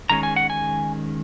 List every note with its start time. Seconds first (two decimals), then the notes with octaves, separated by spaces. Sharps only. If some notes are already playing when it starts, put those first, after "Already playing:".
0.09 D#3 G#3 C#4 A#5
0.23 G#5
0.36 F#5
0.50 G#5